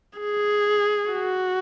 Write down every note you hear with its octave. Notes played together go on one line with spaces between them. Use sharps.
G#4
F#4